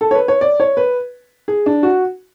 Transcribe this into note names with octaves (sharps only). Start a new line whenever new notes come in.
A4
C#5
B4
C#5
D5
C#5
B4
G#4
D4
F#4